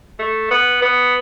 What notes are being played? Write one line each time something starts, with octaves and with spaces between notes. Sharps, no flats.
A3
B3
B3